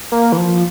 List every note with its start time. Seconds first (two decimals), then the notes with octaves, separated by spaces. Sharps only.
0.12 A#3
0.32 E3
0.37 F3